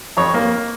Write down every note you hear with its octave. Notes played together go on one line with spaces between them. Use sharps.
F2 C#5
A#3